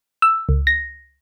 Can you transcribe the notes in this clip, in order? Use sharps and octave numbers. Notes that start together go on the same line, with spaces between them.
E6
C#2
A#6